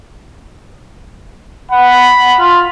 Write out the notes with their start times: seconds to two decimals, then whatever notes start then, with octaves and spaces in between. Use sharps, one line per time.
1.71 F#5 B5
2.40 F4